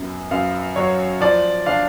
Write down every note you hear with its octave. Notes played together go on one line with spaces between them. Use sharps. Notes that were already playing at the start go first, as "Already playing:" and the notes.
Already playing: F#2 B3
F#2 F5
F#3 C#5
F3 D5
D4 F5